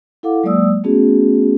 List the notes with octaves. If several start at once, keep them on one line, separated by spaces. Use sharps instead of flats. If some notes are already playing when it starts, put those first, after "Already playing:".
E4 A4 F5 F#5 D6
F#3 G#3 A#3 D5 D#6 E6
A3 B3 C#4 F#4 G#4